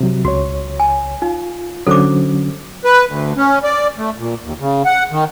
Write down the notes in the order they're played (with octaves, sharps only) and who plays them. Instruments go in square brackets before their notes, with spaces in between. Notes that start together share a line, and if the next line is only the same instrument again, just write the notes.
[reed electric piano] C3 F#3
[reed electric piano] C#2 C#5 [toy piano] F#4
[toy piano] G#5
[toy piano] D#4 [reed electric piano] F4
[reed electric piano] D3 F#3 C#4 [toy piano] A4 C5 D6
[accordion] B4
D2
C#4
D5
A3
A#2
D#2
C#3
F#5
D#3